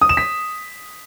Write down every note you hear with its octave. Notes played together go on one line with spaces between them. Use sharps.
D#6
E7
B6